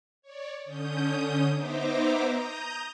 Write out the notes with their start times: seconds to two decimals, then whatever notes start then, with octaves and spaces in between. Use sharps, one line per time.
0.22 C#5 D5
0.65 D3 C#4 D#6 G6
1.55 B3 D#4 C5 E5 A#5 D6
2.28 A#5 D#6 G6